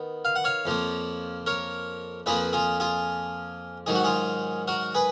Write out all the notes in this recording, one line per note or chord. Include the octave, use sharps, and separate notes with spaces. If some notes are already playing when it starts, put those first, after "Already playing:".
Already playing: D#3 B3
F5
F#5
C#5 F5
F2 F3 A#3
A#4 C#5
F2 F3 A#3 G#4 B4
F4 G#4
F4 G#4
G#2 D#3 F#3 G#4
F#4
F4 G#4
F#4 A#4
G#4 B4